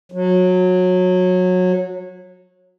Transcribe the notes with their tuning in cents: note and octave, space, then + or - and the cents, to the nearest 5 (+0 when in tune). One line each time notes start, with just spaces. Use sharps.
F#3 -20